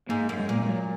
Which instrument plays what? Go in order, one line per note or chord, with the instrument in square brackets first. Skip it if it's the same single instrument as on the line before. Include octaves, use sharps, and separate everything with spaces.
[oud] G#2 [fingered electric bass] A#3
[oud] F#2
[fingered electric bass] G#3
[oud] A#2 [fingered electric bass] A#3
[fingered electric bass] G#3
F#3